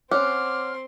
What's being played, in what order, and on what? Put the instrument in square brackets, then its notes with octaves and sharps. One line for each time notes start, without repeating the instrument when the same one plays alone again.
[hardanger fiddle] C4 C6 [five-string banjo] C#4 F#4 [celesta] D6 [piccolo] F6